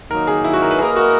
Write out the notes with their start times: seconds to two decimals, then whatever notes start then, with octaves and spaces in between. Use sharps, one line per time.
0.10 D#3 F#3 A#3 D#4 A#4
0.27 G#4
0.44 E4
0.53 F#4
0.62 A#4
0.71 B4
0.79 A#3 E4 G#4 A#4 D#5
0.96 F#4